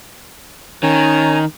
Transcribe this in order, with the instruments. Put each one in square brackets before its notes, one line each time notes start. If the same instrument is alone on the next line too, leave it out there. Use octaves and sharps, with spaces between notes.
[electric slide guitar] D#3 [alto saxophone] C#4 [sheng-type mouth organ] G#5 A#5